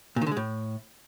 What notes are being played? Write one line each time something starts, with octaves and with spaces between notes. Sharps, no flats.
A#2
D#3
D3
G#3
A2